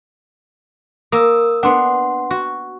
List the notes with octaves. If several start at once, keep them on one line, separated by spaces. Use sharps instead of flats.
A#3 D#6 E6
B3 D4 F#5 C6
F#4